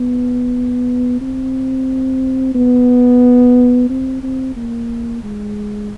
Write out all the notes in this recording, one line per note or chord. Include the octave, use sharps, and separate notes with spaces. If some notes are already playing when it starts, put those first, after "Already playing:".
Already playing: B3
C4
B3
C4
C4
A#3
G#3